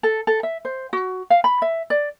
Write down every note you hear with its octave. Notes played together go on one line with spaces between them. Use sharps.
A4
A4
E5
C5
F#4
F5
B5
E5
D5